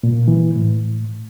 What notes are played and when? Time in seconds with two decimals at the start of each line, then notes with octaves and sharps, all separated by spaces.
0.03 A#2
0.28 E3
0.56 A2